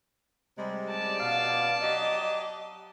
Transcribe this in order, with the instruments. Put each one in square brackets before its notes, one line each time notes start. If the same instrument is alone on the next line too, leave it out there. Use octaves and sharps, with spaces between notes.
[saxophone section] C3 G3 G#3
[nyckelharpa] D5 A5
[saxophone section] B2 F5
F#3 G4 D#5